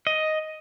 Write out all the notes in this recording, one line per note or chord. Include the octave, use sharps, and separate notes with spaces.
D#5